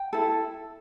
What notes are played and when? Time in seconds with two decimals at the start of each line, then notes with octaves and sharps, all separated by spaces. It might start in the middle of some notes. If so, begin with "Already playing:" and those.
Already playing: G5
0.13 E4 A4